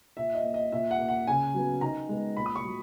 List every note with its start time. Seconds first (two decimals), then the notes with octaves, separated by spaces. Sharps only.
0.17 A#2 E5
0.35 D#5
0.44 A#3
0.54 D#5
0.72 A#2 E5
0.91 F#5
0.99 A#3
1.08 F#5
1.27 C#3 G#5
1.54 F#3 B3
1.81 D#3 A#5
2.09 G#3 B3
2.36 A#2 B5
2.46 D#6
2.56 C#6
2.65 F#3